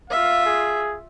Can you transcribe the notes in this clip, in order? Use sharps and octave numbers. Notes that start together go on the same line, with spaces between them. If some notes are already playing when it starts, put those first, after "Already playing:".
F4 E5 F5
G#4